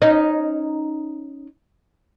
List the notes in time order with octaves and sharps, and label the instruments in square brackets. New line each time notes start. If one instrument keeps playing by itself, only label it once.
[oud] C#4 D#4